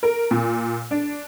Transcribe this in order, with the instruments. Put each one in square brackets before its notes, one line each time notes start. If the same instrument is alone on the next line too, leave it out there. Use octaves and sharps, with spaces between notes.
[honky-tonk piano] A#4
A#2
D4